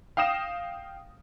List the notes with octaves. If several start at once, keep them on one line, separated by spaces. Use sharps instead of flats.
F5 G5 D#6 A#6 E7